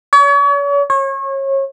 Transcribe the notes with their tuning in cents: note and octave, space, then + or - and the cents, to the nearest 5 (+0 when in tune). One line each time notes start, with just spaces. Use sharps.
C#5 +40
C#5 -30